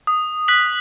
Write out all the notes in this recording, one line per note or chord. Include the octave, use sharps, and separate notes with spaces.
D#6
F#6 B6 F#7